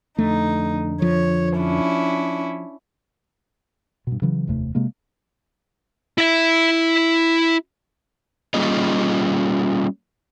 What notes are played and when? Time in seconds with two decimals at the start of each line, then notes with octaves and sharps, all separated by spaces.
0.19 F2 D3 A3 D#4
1.02 F3 C#5
1.56 C#4 D4 E4
4.07 G2 B2
4.22 C#3 E3 F#3
4.47 F1 D#2 C3 A3
4.75 C3 G#3 A#3
6.18 E4 E5
8.54 G3 A#3 C#4 F4 G#4 D#5